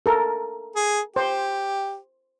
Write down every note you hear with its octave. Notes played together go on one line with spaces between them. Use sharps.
A4 A#4
G#4
G4 C5